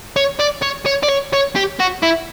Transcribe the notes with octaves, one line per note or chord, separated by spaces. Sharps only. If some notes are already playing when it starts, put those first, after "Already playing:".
C#5
D5
C#5
C#5
D5
C#5
C#5
G4
F#4
E4